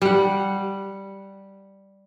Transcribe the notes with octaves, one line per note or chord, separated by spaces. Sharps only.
G3 F#5